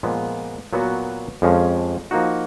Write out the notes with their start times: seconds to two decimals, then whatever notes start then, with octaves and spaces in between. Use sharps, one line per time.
0.03 A#2 F3 G#3 B3
0.73 A#2 F#3 B3 F#4
1.42 F2 F3 G#3 C#4
2.11 F3 A#3 D#4 F#4